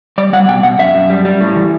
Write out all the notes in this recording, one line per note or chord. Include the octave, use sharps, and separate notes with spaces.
G3 D5
G3 F#5
B2 G5
B2 F#5
F#2 E5
F#2
G3
G3
A2
E3